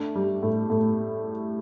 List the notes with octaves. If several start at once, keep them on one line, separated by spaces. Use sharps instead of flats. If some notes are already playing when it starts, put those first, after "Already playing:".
Already playing: A3 D4
G3
A2
A2